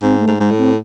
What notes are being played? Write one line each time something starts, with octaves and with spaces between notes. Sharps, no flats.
G#2 C4
A3
G#2
G#2 G#3
A2
C4